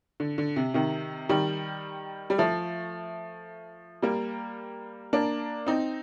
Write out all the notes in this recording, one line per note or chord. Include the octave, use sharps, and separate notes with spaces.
D3
D3
C3
C3 D#3
D#3 G3
G3
F3 A3
G3 A#3
A#3 D4
C4 D#4